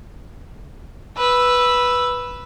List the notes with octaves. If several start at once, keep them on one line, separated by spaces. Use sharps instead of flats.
B4 E6